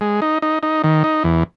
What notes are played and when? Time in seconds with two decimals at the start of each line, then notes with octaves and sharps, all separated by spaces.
0.01 G#3
0.22 D#4
0.42 D#4
0.63 D#4
0.84 D#3
1.04 D#4
1.24 E2